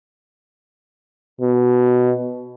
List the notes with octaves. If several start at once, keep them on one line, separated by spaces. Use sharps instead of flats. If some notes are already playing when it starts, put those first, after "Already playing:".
B2